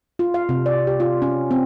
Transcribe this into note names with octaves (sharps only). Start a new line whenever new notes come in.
F4
F5
C3
D5
G4
F4
C#4
C4